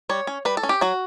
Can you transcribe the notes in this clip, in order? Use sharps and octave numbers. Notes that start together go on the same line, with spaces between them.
G3 C#5
C#4
G3 B4
A4
C#4
G4
F#3 F#4